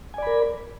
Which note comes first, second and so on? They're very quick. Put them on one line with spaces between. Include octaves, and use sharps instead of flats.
G#5 D5 B5 A#4